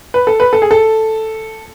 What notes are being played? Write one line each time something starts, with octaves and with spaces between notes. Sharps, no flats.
B4
A4
B4
A4
G#4
A4